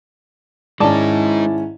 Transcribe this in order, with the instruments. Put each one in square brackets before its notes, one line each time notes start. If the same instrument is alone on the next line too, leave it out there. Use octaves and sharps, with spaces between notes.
[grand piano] G#2 D#3 C#4 [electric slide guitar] G#3 D#4 [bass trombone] E4 [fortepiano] D5 A5